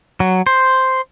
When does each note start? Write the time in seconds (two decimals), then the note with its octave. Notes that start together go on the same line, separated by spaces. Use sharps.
0.20 F#3
0.47 C5